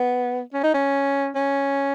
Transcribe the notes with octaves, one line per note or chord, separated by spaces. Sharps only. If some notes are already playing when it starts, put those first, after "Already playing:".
Already playing: B3
C#4
D#4
C#4
C#4